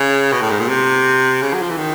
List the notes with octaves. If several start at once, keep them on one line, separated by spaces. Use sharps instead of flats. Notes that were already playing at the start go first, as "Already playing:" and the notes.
Already playing: C#3
B2
A2
G#2
A#2
C3
C#3
F#3
F3
E3
D#3